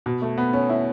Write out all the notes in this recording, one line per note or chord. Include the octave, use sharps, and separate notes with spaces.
B2
A3
B3
C#4
E4